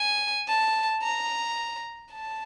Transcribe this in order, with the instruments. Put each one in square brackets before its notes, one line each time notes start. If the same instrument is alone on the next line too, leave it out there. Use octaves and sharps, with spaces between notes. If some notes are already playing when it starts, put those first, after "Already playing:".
Already playing: [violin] G#5
A5
A#5
A5